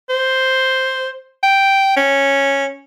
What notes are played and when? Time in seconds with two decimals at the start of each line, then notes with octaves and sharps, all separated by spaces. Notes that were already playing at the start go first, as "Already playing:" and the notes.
0.09 C5
1.43 G5
1.97 C#4